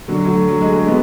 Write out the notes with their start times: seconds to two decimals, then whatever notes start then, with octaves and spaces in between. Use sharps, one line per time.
0.08 D3 F#3
0.24 F#3 A3
0.48 F#3
0.61 G#3
0.73 A3
0.86 G#3 B3